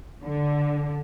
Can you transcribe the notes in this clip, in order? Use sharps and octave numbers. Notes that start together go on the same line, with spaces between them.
D3